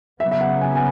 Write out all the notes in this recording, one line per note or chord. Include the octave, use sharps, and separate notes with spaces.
C#3 F#3 B3 E5
E5
F#5
G#5
G#5